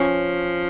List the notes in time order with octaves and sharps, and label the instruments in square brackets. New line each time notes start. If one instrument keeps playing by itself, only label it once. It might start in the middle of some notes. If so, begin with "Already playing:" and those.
Already playing: [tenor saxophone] F3 [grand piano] C#4